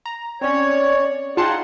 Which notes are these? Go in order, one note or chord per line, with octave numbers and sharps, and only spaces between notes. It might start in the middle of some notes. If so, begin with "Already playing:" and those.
A#5
C4 C#4 C#5 D5
D#4 F4 G#4 F#5 G5 A5 C6